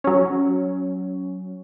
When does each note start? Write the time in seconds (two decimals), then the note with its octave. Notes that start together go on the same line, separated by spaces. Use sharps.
0.04 F#3 C#4